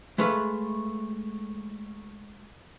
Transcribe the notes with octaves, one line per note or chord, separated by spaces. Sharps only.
G#3 A3 B4 F5